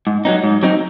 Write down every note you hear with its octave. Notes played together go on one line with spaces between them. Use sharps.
G#2
F#3 C4 D#4
G#2
F#3 C4 D#4